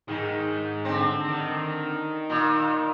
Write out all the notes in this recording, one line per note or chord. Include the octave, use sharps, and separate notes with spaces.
G#2 D#3 G#3
D3 C4
D#3
A#2